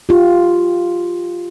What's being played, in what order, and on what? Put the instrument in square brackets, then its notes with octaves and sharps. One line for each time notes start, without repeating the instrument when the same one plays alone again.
[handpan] F4 G4